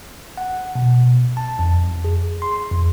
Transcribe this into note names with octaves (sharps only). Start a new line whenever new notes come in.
F#5
B2
A5
F2
G#4
C6
F2